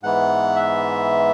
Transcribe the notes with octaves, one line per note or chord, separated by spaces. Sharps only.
G#2 E3 B3 F#5
E5